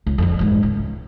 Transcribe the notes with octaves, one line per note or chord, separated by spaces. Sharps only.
C#2
F2 D3
E2 G#2
C#2